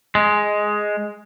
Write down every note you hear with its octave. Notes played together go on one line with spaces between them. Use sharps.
G#3